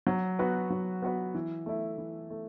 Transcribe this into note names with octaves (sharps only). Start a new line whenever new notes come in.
F#3
B3 F#4 B4
F#3
B3 F#4 B4
E3
A3 E4
E3
A3